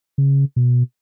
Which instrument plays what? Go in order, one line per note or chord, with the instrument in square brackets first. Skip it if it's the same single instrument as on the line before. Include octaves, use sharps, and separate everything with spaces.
[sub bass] C#3
B2